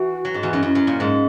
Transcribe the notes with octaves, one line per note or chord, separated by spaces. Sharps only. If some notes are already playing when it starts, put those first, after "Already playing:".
Already playing: E3 F#4
F#3
G#2
E2
F#2 D#4
F#2 E4
F#2
A#2
G#2 D#4